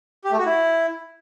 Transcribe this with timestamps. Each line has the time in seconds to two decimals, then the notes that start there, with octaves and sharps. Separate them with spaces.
0.24 G4
0.31 A3
0.38 F#4
0.46 E4